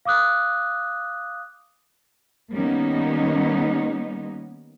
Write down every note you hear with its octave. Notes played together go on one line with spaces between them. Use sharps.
F5 D6 D#6 F#6
D#3 G3 A#3 B3 C#4 D#4